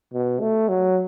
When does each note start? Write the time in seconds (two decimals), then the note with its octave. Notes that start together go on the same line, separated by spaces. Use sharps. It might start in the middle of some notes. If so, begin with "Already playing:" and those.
0.13 B2
0.40 A3
0.69 F#3